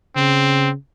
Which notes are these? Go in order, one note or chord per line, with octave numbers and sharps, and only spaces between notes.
C#3 C4